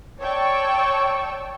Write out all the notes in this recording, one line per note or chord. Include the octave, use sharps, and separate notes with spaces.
C#5 D5 G5 A5 C#6 E6